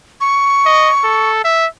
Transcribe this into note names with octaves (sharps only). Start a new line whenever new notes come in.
C#6
D#5
A4
E5